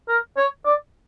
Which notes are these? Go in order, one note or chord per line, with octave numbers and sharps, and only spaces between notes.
A#4
C#5
D5